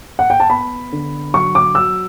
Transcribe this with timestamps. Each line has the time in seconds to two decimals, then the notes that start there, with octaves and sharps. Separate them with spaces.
0.19 F#5
0.30 G5
0.40 A5
0.49 B3 B5
0.92 D3
1.34 F#3 C#6
1.55 D6
1.75 F#3 E6